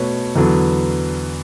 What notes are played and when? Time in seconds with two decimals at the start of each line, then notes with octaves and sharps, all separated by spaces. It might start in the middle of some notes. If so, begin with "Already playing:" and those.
Already playing: B2 A3 B4 C#5
0.35 E2 D3 F#3 B3